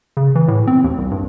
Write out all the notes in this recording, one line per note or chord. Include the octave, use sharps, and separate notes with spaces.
C#3
E3
A2
C4
D#2
C2
G2